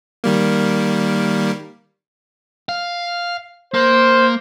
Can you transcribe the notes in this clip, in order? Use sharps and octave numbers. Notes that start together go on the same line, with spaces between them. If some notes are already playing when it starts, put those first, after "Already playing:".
D#3 G3 A#3
F5
A#3 C5